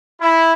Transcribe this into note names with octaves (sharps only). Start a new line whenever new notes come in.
E4